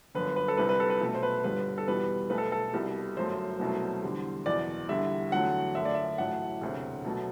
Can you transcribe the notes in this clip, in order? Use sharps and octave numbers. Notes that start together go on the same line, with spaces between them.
G1 F#2 D3 B4
B4
A4
C2 C3 G3 B4
B4
A4
B4
B1 B2 A3
C5
B4
G1 G2 D3 G3 B4
A4
E2 B2 G3 B4
B1 B2 A3 B4
A4
A4
C2 B2 G3
G1 F#2 F#3 A3 C5
C2 B2 F#3 A3
E2 D3 G3
F#1 E2 B2 D5
E2 D3 G3 E5
E2 D3 F#3 A3 F#5
F#2 D3 A3 E5
D5
E5
A1 A2 F#3 A3 F#5
E1 D2 C3
B2 F#3 A3